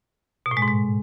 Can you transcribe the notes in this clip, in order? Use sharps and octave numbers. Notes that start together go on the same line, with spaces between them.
B2
A2
G#3
G#2
G#3